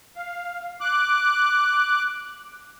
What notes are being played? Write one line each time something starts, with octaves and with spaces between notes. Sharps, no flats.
F5
D6 F#6